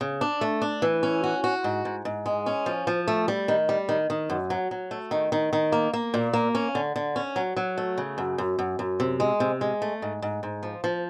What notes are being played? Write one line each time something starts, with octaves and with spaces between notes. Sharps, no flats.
C#3
D4
A3
D4
E3
C#4
F#4
F#4
G#2
G#2
G#2
G#3
C#4
F3
F3
A3
G3
D#3
G3
D#3
D#3
F#2
F#3
F#3
A3
D#3
D#3
D#3
A#3
A#3
A#2
A#3
C#4
D3
D3
C#4
F#3
F#3
A3
C#3
F#2
F#2
F#2
F#2
C3
G#3
C3
G#3
A3
G#2
G#2
G#2
F3
F3